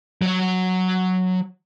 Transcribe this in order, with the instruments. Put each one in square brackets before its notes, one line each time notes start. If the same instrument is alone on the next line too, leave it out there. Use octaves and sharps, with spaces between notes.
[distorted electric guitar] F#3 C#5